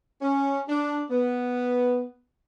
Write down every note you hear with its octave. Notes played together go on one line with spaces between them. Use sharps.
C#4
D4
B3